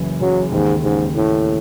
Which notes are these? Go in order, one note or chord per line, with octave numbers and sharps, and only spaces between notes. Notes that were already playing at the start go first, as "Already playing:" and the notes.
Already playing: F#1 F#2 E3
C#3 F#3
D#2 G#2
G#2 C#3
A2 C#3